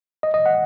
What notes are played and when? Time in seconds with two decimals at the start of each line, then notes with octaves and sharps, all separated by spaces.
0.23 D#5
0.34 D#5
0.46 F#5